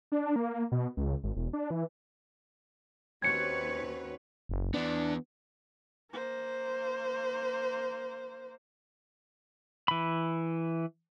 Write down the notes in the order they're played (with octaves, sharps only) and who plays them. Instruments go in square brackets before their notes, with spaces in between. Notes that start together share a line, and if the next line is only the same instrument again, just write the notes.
[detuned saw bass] D4
A#3
B2
C#2
G#1
E1
D4
E3
[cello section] D#2 B4 C#5 [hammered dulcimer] C4 C#4 F#4 [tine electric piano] G#6 C#7
[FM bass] F#1
[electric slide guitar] E3 B3 [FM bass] D4
[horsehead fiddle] A#3 C5
[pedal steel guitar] E3 B5